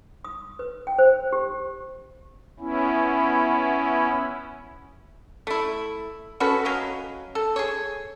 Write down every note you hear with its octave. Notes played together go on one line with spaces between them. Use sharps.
D#6
B4
G5
C5
G4
B3 C#4 E4
A3 E4
C#4 F#4 A4 B4
F#3 C#4 D#5 F5
A4
G#4 C#5